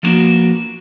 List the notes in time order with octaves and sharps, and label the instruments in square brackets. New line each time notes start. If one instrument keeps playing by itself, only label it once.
[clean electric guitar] F3 G3 A#3 B3 D4 F#4